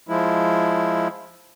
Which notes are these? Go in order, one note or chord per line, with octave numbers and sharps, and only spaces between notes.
F3 G#3 E4